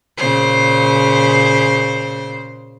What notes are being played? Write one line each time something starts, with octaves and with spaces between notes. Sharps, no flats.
A#2 C#3 C5